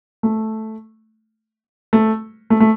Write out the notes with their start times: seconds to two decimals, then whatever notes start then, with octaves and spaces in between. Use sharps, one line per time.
0.23 A3
1.93 A3
2.50 A3
2.60 A3